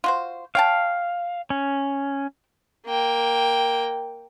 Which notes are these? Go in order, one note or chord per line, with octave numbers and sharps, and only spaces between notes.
F4 F#4 C5
C#5 F5 G5 A5
C#4
A#3 G5